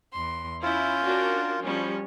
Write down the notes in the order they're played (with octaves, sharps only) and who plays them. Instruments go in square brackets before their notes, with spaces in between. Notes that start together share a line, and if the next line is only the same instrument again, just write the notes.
[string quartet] E2 C6
[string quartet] C#4 G6 [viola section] E4 [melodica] F4
[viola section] D4 F#4 A#4
F3 G3 C#4